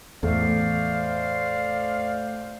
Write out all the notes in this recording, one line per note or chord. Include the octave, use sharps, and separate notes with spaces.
E2 A2 C5 D5 F5